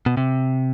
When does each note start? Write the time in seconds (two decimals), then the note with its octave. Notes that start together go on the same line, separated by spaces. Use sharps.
0.06 B2
0.17 C3